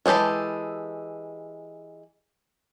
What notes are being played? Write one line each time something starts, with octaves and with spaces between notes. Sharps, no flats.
E3 G#3 G4 A4 B5